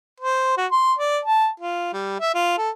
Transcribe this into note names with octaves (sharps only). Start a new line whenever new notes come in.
C5
F#4
C6
D5
A5
F4
G3
E5
F4
A4